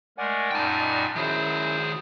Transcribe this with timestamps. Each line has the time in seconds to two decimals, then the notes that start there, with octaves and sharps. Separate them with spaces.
0.18 G#3 A3 A#4 D5 F#5 G#5
0.51 F#2 A#2 D#4 G5 A5
0.80 D5 D#5 F#5
1.16 F#2 D#3 F#3 E4 F#4 G#4 C5